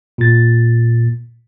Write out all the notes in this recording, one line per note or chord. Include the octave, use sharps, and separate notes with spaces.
A#2 A6